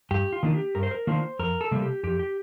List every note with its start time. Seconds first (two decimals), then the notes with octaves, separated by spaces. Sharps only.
0.11 G2 G4
0.33 F4
0.43 D#3 A#3 D4 F4
0.54 G4
0.75 G2 A#4
0.83 C5
0.91 A#4
1.07 D#3 A#3 D4 F4 C5
1.39 F2 A#4
1.61 A4
1.71 C3 G3 A#3
1.82 G4
2.03 F2 G4
2.19 G4